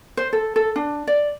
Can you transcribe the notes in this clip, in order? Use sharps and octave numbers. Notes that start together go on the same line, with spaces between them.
C5
A4
A4
D4
D5